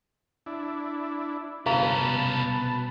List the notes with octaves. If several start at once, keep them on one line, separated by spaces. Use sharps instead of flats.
D4 E4
G1 C2 C#4 G#4 B4 F5 A5 A#5
B2